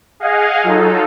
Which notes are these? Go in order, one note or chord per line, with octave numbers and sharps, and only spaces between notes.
G#4 D#5 F5 F#5 G#5
F#3 D#4 F4 A4